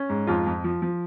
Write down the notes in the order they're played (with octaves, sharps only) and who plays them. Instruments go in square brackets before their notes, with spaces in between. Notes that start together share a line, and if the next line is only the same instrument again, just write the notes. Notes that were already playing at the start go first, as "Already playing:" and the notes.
Already playing: [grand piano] C#4
G#2
F2 F4
F2
F3
F3